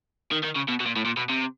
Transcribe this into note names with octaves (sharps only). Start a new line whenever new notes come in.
D#3
D#3
C#3
B2
B2
A#2
A2
A#2
B2
C3